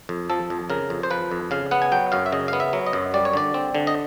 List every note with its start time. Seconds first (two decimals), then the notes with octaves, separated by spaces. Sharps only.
0.09 F2
0.30 F3 A4
0.50 F2
0.70 C#3 A#4
0.90 F2
1.03 C5
1.10 F3 B4
1.32 F2
1.51 C#3 F5
1.71 B3 F#5
1.82 G#5
1.92 F#3 G5
2.12 F#2 F5
2.26 E5
2.32 C#3 D#5
2.48 B3 F5
2.60 E5
2.73 F#3
2.86 D#5
2.93 F#2
3.14 G3 D5
3.25 C#5
3.33 D3 D5
3.54 C4
3.75 D3
3.87 D#5